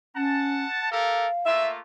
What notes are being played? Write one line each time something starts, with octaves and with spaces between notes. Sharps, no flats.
C#4 F#5 A5
G4 A4 A#4 F5
A3 A#3 F4 E5